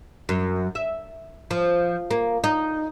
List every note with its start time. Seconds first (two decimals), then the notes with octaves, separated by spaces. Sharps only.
0.29 F#2
0.75 E5
1.51 F3
2.11 A#3
2.44 D#4